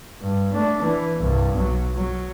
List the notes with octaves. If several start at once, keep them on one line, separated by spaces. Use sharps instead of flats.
G2
A3 D4
E3
C2 G2
B1 F#3
F#3